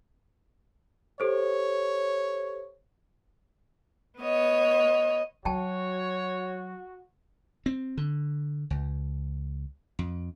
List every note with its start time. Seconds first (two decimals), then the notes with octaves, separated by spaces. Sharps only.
1.20 G4 A4 C5 C#5
4.20 B3 C#5 D#5
5.45 F#3 F#4 C#5 G5 A5
7.66 C4
7.98 D3
8.70 C#2
9.99 F2